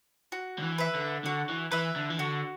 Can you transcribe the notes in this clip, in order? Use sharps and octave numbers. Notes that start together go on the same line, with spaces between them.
F#4
D3
E3
B4 E5
D3
D3 F#4
E3
E3 B4 E5
D3
E3
D3 F#4